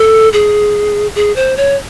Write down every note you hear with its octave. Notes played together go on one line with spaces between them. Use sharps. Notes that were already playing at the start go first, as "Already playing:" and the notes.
Already playing: A4
G#4
G#4
C5
C#5